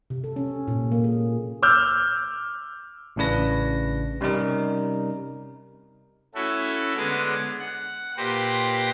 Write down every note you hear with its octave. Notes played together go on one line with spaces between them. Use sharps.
C3
A4
C#4
A#2
A#3
G#4
D6 E6 F6 G6
A1 A2 C#3 D4 B4 A#6
C3 G3 C#4 D#4 A#4
A3 C#4 E4 F#4 A4
D3 G#3 B3 G#4 D6
F#5
A#2 G4 B4 C5 A#6